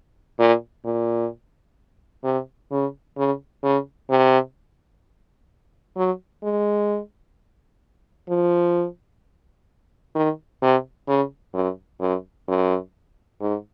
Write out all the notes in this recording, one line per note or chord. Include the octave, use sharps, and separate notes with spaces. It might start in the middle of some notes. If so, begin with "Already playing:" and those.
A#2
A#2
C3
C#3
C#3
C#3
C3
F#3
G#3
F3
D#3
C3
C#3
F#2
F#2
F#2
G#2